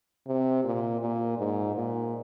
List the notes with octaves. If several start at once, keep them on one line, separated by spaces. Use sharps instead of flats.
C3
A#2
A#2
G#2
A#2